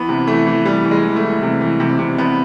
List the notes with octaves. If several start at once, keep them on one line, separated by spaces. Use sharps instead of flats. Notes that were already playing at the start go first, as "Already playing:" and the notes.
Already playing: E3 B3
C3
E3 A3
E3
E3 G3
E3
G#3
E3
A3
E3
C3
E3
C3
C3
C3 B3